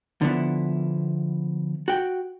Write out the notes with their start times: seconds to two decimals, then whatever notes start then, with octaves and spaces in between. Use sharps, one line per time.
0.22 D3 F3 B3 E4
1.88 F#4 G5